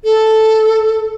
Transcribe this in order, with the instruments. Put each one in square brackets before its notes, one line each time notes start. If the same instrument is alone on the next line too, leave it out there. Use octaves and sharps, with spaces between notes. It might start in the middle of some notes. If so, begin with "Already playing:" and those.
[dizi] A4